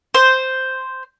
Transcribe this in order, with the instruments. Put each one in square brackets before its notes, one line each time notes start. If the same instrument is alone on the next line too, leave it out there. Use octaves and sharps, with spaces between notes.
[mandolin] C5